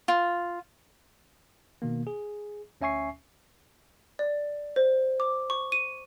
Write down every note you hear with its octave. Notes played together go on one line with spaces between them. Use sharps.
F4
B2 D#3 A#3
G#4
D2 C#4 E5 G#5 C#6 C7
D5
C5
D6
C#6
D#7